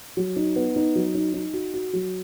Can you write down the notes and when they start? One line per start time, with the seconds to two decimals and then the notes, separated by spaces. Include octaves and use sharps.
0.17 F#3
0.36 D#4
0.56 B3
0.76 D#4
0.95 F#3
1.15 D#4
1.34 D#4
1.54 F#4
1.74 F#4
1.93 F#3